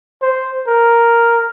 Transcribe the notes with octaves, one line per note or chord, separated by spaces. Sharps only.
C5
A#4